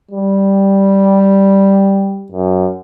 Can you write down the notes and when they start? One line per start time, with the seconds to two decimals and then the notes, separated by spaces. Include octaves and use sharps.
0.11 G3
2.32 F#2